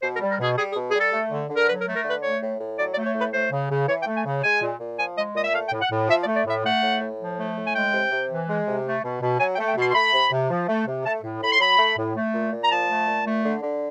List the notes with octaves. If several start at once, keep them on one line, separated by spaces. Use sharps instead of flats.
B2 C5
A#4
G3
A#4
B2 G#4
G3 G#4
G#4
B2
G#4
G3
A4
A3
D3
D3
A#4
F#3 B4
A#4
A3
A#4
D3 B4
A3 C#5
A2
A2
F#3 D5
D5
A3
C#5
A2 B4
A3 C5
C#3
C#3
E3 C#5
G5
A3
G#5
C#3
G#3 G#5
A#2
A#2
F3 G#5
G#3 D#5
A#2 D#5
E5
A3 F5
G5
A2
F#5
A2
F3 E5
D5
A3
D5
A2 E5
A3 F#5
A2
A2
F3
A3
A2
G#5
G#3 G5
C3
C3
E3
G#3
C3
A3
B2
B2
F#3 G#5
G5
A3
G5
B2 C6
C6
A3 B5
C3
C3
F3
A3
C3
A3 A5
A2
A2 B5
C6
F#3 B5
A3
A2
A3
A#2
A#2
A#5
F3 A5
A3
A#2
A3
D3
D3